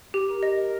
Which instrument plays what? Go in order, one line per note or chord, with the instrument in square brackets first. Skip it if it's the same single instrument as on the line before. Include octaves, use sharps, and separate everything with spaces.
[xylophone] G4
[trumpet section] A#4
[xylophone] D#5